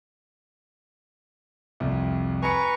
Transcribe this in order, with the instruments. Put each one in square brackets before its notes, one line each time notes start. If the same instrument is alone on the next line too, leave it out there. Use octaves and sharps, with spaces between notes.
[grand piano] C2 F2
[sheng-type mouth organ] B4 A#5 C#6 [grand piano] G#5 C#7